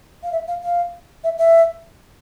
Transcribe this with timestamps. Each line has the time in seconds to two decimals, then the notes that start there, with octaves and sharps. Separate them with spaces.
0.23 F5
0.32 E5
0.48 F5
0.63 F5
1.24 E5
1.38 E5